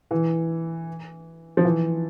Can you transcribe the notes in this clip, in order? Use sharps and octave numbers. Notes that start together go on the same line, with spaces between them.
E3
F3
E3